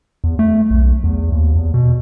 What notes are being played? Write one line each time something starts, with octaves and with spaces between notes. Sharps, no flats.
E2
A3
B1
E2
D#2
E2
B2